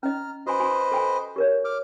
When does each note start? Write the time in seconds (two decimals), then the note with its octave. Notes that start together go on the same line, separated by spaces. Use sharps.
0.03 C#4 D#5 A#5 F6
0.47 F#4 B4 C5 D#5 G#5
0.60 F#4 G#5
0.92 A4 G5 G#5
1.36 G4 A#4 C#5
1.65 D6 F6